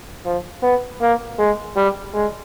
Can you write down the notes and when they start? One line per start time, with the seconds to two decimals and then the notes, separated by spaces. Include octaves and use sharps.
0.25 F3
0.63 B3
1.01 A#3
1.39 G#3
1.76 G3
2.14 G#3